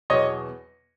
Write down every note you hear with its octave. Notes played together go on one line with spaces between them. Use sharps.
E2 B2 F#3 C#5 D#5